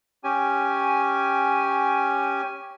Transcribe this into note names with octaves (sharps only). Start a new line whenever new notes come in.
C#4 G4 G#5